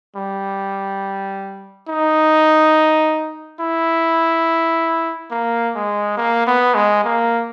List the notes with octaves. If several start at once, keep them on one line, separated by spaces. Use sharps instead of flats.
G3
D#4
E4
A#3
G#3
A#3
B3
G#3
A#3